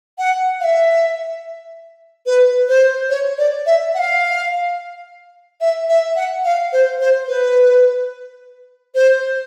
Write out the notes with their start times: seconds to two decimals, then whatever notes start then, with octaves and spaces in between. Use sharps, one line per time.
0.18 F#5
0.60 F5
0.64 E5
2.26 B4
2.69 C5
3.10 C#5
3.38 D5
3.66 E5
3.94 F#5
3.99 F5
5.61 E5
5.89 E5
6.16 F#5
6.45 F5
6.73 C5
7.01 C5
7.28 B4
8.95 C5